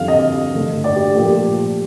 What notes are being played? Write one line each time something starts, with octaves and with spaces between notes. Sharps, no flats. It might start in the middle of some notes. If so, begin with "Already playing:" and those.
Already playing: F2 D3 G3 F5
D#5
G2 D3 A3
D5
G4
A#2 F3 A3 G4